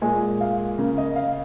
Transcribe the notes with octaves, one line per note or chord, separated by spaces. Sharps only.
A#2 G#3 G#5
F5
C#3 A#3 A#4
D#5
F5